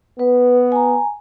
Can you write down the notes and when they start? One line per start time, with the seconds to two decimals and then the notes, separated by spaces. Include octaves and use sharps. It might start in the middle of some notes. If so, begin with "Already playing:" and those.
0.19 B3 B4
0.72 G#5 A#5